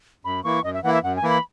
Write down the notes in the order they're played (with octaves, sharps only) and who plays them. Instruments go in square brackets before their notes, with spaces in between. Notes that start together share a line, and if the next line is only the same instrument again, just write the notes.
[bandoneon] F#2 [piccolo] B5
[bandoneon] E3 A#3 E4 [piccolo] C#6
[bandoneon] F#2 [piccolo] D#5
[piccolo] E5
[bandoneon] E3 A#3 E4 [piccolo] F#5
[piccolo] E5
[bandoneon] F#2 [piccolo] F#5
[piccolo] G#5
[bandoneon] E3 A#3 E4
[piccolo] B5